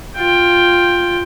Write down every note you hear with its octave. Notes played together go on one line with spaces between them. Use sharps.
F4 G5